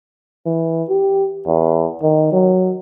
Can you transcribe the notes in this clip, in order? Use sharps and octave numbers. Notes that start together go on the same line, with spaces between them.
E3
G4
E2
D#3
F#3